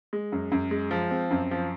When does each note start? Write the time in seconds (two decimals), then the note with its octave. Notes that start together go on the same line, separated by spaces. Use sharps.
0.13 G#3
0.32 F#2
0.52 F#2
0.71 G#3
0.91 F3
1.11 C4
1.31 F#2
1.51 F3